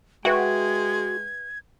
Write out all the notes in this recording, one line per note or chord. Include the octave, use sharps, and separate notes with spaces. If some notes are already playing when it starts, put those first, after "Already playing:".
G#3 F#4 B4 E5 G5 G#6